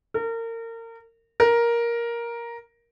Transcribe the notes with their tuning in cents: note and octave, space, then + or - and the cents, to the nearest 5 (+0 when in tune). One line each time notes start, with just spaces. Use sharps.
A#4 -30
A#4 +10